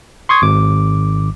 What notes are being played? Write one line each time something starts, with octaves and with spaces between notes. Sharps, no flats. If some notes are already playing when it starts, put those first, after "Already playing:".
C6 C#6 D#6 G#6
G#1 D6